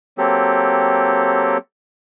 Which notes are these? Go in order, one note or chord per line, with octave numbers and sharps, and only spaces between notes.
F#3 A#3 C4 G4 A4